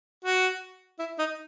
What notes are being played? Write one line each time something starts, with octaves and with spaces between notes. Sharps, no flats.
F#4
E4
D#4